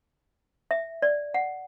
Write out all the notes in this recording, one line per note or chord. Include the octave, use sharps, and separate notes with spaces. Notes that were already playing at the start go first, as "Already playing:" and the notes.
E5
D5
F#5